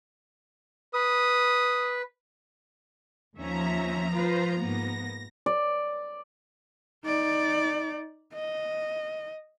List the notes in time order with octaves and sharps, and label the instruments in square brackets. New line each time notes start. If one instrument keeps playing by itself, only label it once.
[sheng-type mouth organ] B4 [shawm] D#6
[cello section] D#2 C#4 E5 [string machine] F3 A#5
[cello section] F4 B4 C5
[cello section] G#2 A#3 B3 [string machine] A#6
[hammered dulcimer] D5
[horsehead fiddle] D#4 D5
D#5